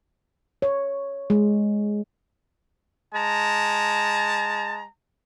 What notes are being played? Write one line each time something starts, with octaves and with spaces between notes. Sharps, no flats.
C#5
G#3
G#3 A5 A#5